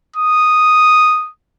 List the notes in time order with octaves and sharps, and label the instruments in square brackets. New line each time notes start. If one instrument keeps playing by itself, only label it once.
[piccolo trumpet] D#6